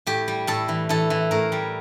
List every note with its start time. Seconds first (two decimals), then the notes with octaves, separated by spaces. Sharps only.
0.07 A2 G4
0.28 G3
0.47 A2 A4
0.68 E3
0.89 E3 A4
1.10 E3
1.31 A2 A#4
1.52 G3